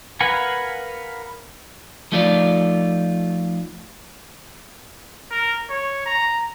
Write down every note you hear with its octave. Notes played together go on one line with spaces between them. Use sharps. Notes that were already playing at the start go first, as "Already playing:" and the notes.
A#4 B4 F5 F#5 G#5
F3 A3 D#4 F4 D5
A#4
C#5
A#5